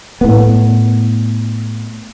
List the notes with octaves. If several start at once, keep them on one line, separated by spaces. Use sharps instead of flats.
A2 B3